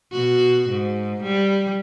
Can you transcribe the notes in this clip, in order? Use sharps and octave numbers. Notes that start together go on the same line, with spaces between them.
B2 F#4
G#2
G3